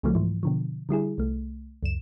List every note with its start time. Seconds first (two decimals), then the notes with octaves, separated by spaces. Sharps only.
0.03 C2 C3 D#3 F3 F#3 A3
0.15 G#2 E3 F3
0.43 B2 D3 F3
0.89 D3 G3 E4 G#4
1.18 C2 A3
1.83 C#2 F#2 E7